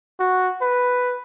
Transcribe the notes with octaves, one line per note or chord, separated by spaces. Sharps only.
F#4
B4